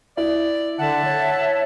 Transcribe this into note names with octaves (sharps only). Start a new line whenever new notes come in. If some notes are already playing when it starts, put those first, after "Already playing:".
E4 D5
D3 E5 F#5 A5
C#5